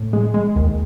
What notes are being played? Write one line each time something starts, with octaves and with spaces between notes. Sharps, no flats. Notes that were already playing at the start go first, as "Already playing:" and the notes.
Already playing: A2
G#3
G#3
D#2